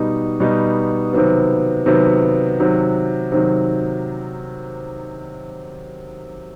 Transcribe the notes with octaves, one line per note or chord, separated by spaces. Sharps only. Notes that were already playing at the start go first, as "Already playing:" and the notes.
Already playing: B2 G3 B3 D#4
B2 G3 B3 D#4
C3 D#3 F#3 B3
C3 D#3 F#3 B3
C3 D#3 F#3
C3 D#3 F#3